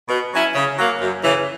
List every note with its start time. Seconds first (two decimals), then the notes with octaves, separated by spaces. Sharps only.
0.09 B2
0.32 F#3 C#4 E4
0.55 C#3
0.77 F#3 A#3
1.01 F#2
1.23 C#3 E3